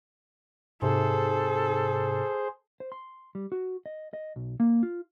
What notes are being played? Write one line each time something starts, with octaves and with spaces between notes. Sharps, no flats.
G#2 C3 G#4 A4 C5
C5
C6
G3
F#4
D#5
D#5
B1
A#3
F4